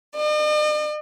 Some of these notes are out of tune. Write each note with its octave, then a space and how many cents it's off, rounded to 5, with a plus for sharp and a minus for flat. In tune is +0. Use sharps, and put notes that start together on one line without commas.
D#5 -45